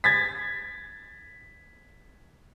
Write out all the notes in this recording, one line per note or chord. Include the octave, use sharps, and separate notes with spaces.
G#6 A6 B6